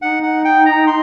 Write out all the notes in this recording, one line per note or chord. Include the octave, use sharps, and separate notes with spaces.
D#4 F#5
F#5
G5
A#5
C6